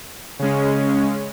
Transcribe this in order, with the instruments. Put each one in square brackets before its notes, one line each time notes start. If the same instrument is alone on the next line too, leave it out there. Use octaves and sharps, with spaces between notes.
[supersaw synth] C#3 G#3 C#4